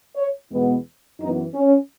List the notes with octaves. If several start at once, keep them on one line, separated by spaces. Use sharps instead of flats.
C#5
E2 B2 G#3 B3
F#2 E3 B3 D#4
C#4